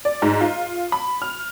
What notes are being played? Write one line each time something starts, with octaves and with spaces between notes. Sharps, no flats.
D5
G#2
F4
B5
F6